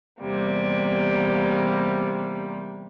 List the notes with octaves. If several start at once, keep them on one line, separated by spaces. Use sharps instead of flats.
E2 C3 G3 A#3